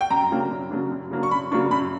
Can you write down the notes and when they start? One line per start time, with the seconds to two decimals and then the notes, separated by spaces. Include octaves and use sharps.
0.01 G5
0.10 F#2 A#5
0.31 C#3 F#3 A#3 D4
0.51 F#2
0.71 C#3 F#3 A#3 D4
0.91 F#2
1.11 C#3 F#3 A#3 D4
1.23 C#6
1.31 F#2 B5
1.52 C#3 F#3 A#3 D4 C#6
1.71 F#2 B5